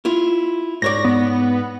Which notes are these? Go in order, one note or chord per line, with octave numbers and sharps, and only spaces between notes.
E4 F4
G#2 C#5 D5 A#6
B3